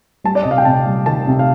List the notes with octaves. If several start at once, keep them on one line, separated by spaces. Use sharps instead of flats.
G3 A5
D5
C3 D#5
F5
G5
C3 A5
G3
D#3 A5
C3
F5